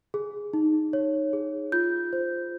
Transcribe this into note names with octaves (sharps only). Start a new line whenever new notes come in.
G#4
D#4
C#5
G#4
F4 G6
C5